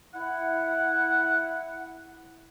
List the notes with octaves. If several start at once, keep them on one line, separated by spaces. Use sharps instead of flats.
E4 F#5